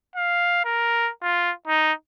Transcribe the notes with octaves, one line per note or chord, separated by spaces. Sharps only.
F5
A#4
F4
D#4